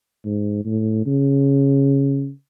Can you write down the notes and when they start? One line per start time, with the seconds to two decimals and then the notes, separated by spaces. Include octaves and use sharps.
0.25 G#2
0.65 A2
1.06 C#3